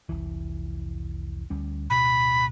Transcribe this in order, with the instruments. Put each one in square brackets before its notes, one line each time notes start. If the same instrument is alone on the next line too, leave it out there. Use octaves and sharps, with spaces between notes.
[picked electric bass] F1 C2 E3
D2 G3 C#4
[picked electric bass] D1 B2 [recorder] B5